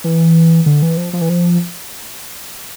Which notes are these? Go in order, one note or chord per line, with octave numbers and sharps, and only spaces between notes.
E3
D3
E3
F3
F3
E3
F3